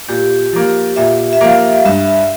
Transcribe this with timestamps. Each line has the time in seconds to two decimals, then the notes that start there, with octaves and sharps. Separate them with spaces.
0.09 A#2 G4
0.53 F3 A#3
0.96 A#2 E5
1.33 E5
1.41 F3 A#3 F5
1.85 G2 E5